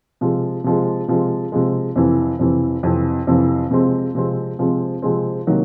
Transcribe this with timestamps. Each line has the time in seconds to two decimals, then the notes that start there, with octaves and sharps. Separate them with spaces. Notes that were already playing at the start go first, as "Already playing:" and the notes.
0.21 C3 F3 G#3
0.64 C3 F3 G#3
1.08 C3 F3 G#3
1.52 C3 F3 G#3
1.96 F2 C3 E3
2.39 F2 C3 E3
2.83 F2 C3 E3
3.27 F2 C3 E3
3.71 C3 F3 G#3 C4
4.15 C3 F3 G#3 C4
4.58 C3 F3 G#3 C4
5.02 C3 F3 G#3 C4
5.47 C3 D#3 F#3 A#3